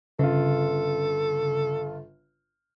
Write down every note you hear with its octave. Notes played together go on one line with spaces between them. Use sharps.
G1 C#3 F4 A4